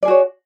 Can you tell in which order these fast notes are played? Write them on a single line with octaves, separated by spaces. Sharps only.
D5 G#4 F#4 C#5